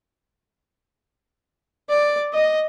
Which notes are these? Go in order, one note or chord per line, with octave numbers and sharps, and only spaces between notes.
D5
D#5